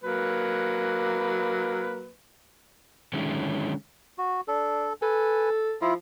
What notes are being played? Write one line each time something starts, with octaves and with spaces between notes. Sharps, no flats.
F#3 A#3 B4
D3 D#3 F#3 G#3 C#4 E4
F#4
D4 A4
A4 B4 G#5
F3 E4 F4